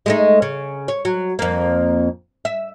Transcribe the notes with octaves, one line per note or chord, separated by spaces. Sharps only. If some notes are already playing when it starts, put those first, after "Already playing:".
G#3 A3 D#4
C#3
C#5
F#3
F2 A#3
E5